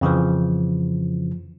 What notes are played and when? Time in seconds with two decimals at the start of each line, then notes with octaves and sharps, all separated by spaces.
0.01 F2 C#3 E3 F3